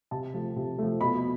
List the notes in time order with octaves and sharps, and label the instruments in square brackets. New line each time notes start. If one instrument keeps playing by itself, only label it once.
[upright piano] C3 A5
F3 A3
C3
F3 A3
B2 B5